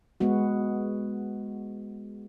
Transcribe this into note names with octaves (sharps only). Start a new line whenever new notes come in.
G#3 B3 F#4